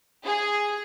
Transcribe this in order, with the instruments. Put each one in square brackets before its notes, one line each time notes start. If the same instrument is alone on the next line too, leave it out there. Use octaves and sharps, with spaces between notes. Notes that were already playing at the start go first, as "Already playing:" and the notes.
[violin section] G#4